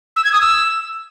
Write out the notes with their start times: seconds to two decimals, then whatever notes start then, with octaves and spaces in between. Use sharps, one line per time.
0.16 E6
0.24 G#6
0.33 D#6
0.41 E6